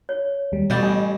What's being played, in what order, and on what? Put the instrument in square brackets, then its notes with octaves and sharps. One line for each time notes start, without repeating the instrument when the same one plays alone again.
[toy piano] C#5
[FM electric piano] D#2 G3
[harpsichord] A1 G3 [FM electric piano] B2 G6 A6
[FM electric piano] D#5 [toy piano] G#5